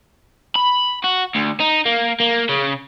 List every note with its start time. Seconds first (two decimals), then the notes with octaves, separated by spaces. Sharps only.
0.56 B5
1.04 F#4
1.35 D2
1.60 D#4
1.86 A#3
2.20 A#3
2.49 C#3